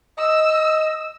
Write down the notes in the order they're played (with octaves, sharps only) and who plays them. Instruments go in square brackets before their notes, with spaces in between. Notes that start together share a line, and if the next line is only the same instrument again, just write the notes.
[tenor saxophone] D#5 [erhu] E6